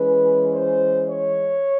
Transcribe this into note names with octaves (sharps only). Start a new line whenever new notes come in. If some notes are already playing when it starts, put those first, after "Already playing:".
Already playing: E3 G#3 C#4 B4
C5
C#5